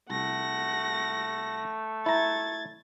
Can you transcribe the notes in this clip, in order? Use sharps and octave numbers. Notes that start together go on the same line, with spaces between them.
C2 A3 F#5 A#6
E4 A#5 G#6 A6